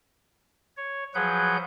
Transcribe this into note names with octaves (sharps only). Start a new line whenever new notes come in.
C#5
F3 F#3 G#4 B4 F#5 G6